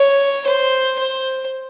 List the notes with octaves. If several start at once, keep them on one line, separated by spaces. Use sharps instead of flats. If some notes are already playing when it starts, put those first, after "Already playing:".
Already playing: C#5
C5
C5